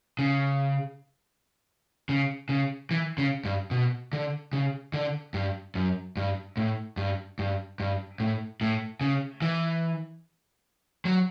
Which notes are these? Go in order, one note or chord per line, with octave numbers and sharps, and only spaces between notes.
C#3
C#3
C#3
E3
C#3
G2
B2
D3
C#3
D3
G2
F#2
G2
A2
G2
G2
G2
A2
A2
C#3
E3
F#3